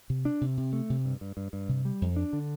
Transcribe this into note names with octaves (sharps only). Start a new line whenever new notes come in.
C3
D4
C3
C3
A3
C3
G2
G2
G2
G2
C3
G3
F2
D4
D3